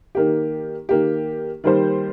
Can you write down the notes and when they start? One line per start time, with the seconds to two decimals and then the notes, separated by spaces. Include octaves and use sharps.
0.15 D#3 A#3 G4
0.89 D#3 A#3 G4
1.64 D#3 G3 A#3 G4 C5